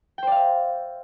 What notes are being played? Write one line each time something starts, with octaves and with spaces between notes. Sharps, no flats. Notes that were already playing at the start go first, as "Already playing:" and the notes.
C5 D5 E5 F5 G5